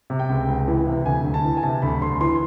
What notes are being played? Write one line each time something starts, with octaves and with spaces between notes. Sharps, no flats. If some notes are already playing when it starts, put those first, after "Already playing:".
C3
G5
C#2
C#2
E3
C3
D2 G#5
D2
A5
E3
G#5
C3 A5
D2 B5
D2 C6
E3 C6